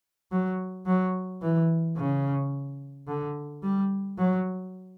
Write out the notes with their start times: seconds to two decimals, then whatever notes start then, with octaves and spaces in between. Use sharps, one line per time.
0.31 F#3
0.86 F#3
1.42 E3
1.97 C#3
3.07 D3
3.63 G3
4.18 F#3